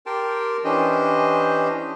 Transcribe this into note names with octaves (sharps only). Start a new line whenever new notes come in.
G4 A#4 G5 A5 C6
E3 C#4 D4 G4 C5 D#5